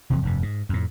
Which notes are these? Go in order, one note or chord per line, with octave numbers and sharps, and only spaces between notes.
E1 C3 E3 F3
F1 G2 C3
G#2
F2 A2